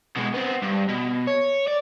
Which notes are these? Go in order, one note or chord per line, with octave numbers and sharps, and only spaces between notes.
B2 G#3
B3 C4
G2
B2
C#5
D5